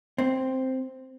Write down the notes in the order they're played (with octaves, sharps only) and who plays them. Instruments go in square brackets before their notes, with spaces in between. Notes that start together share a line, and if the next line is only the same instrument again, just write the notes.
[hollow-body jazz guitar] C4